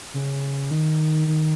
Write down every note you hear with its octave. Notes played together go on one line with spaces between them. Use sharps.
C#3
D#3
D#3